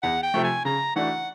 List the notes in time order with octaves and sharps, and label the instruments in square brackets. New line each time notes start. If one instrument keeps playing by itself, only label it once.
[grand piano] E2 [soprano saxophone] F#5
[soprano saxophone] G5
[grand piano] C3 F3 A3
[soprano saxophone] G#5
[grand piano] C#3 [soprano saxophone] A#5
[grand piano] E3 A3 D4 F#4 [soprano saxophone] F#5